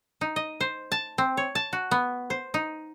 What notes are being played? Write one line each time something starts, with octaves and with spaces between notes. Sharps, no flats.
D#4
D#5
C5
A5
C4
C#5
A5
F#4
B3
C5
D#4